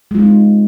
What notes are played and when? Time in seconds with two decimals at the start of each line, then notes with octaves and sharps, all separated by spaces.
0.11 G#3
0.15 F4
0.19 D#4
0.22 C4